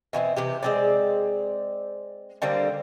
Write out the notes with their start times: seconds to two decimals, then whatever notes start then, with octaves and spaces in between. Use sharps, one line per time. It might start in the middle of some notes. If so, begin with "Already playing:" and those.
0.13 B2 E3 B3 C4
0.36 C3 E3 G4
0.63 G#3 C4 D5
2.42 D3 G3 A#3 C4